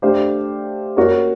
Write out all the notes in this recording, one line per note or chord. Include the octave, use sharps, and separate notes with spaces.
A3 D4 G4 C5 F5
A#3 C#4 F#4 A#4 C#5